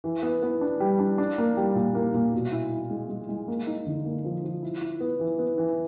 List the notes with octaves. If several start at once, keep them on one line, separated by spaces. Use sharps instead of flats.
E3
B3
B3
D4
G3
D4
D4
A#3
G3
A#2
A#3
A#2
B2
E4
E4
G#3
G#3
G#3
A#3
D#4
D3
A#3
F3
F3
E4
E4
B3
E3
B3
E3